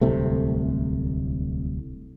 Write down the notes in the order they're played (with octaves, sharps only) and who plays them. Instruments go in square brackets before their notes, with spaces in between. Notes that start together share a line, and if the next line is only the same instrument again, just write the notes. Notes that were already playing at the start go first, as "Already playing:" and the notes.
[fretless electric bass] D1 C2 C3 A3